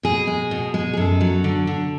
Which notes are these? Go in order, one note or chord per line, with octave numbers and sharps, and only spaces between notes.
B2 G#4
G#3
B2
G#3
G#4
F#2 A4
F#3
D3
D3